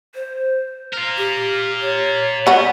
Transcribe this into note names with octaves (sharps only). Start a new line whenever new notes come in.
C5
F4 A#4
G4
C#5
G3 B3 F#4